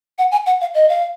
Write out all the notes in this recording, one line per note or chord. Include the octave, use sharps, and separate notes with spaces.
F#5
G#5
F#5
F5
D#5
F5